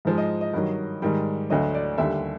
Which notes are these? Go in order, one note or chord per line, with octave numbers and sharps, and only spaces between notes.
G#2 F3 G#3
D#5
D#5
G2 D#3 F#3
G#2 D#3 G3
D2 D3 F#3 D#5
D5
D#2 D3 G3 E5